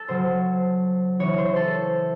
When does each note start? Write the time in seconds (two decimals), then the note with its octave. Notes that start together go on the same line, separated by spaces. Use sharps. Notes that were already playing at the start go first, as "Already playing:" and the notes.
Already playing: A4
0.08 C#3 F#3 C5
1.19 C#3 E3 C#5
1.38 C5
1.56 A4